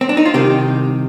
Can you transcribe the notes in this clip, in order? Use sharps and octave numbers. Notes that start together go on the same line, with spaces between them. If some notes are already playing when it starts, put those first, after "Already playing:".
C4
D4
D#4
F4
C2 C3 D#3 G4